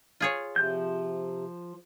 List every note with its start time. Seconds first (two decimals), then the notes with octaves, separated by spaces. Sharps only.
0.20 F4 G#4 C#5
0.56 C3 F3 G6